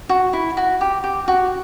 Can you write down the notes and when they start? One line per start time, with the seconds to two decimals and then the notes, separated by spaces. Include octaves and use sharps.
0.09 F#4
0.33 E4
0.57 F#4
0.81 G4
1.04 G4
1.28 F#4